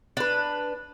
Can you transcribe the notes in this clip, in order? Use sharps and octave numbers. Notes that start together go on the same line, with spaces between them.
D4 B4